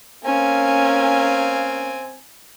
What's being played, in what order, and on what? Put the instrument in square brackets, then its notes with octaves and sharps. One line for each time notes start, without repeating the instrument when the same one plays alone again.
[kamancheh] A#3 C#4 [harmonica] C4 F5 G#5